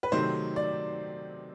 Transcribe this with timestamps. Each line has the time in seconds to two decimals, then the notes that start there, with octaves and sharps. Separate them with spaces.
0.03 B4
0.12 C3 D#3 F#3 A3 C4 C5
0.56 D5